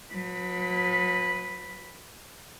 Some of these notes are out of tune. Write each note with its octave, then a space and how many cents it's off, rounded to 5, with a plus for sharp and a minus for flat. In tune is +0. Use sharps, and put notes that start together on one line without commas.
F#3 -40 B4 +0